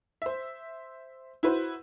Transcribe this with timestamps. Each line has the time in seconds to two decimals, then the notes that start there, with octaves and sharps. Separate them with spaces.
0.22 C5 E5
1.43 E4 F#4 B4 C5